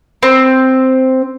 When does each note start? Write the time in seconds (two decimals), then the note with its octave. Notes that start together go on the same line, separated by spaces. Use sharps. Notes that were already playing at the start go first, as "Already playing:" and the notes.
0.23 C4